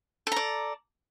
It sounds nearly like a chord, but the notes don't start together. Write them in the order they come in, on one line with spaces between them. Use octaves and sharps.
A4 A#5 D5